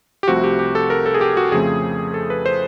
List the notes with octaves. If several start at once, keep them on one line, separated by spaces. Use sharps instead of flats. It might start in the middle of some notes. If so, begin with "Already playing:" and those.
G4
C2 C3 F3 A3 C4 F#4
G4
G4
A4
A#4
A4
G#4
G4
F#4
F2 C#3 F3 A3 C4 G#4
A4
B4
C5